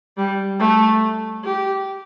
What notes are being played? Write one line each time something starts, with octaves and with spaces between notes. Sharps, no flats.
G3
A3
G4